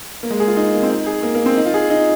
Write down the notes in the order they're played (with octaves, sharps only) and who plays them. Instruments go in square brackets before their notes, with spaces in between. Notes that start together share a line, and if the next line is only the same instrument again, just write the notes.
[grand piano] A#3
G#3
G#4
F4
D#4
A#3
C4
D#4
G#4
A#3
A#3
C4
D#4
F4
G#4
D#4